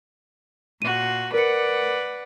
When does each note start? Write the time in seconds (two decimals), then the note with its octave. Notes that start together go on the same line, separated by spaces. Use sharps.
0.82 A#2 F#4 D#7
1.34 A#4 B4 D5 F#5 C#7